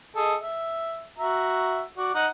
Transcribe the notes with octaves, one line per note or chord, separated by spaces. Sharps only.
G#4 A4 D#5
E5
F#4 E5 A#5
F#4 D5
D#4 F#5